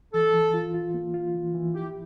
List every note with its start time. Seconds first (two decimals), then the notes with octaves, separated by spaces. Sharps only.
0.13 E3 A4
0.34 E3
0.54 F4
0.74 F4
0.94 A#3
1.14 F4
1.35 E3
1.55 E3
1.74 E4 G4